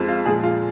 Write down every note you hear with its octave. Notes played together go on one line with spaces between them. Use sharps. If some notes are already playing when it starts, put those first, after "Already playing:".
Already playing: F2 F3 G#3
F4
A#2 F3 G#3 G#4
F4